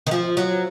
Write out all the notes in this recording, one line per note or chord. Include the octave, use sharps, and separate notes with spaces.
D#3
F3
F#3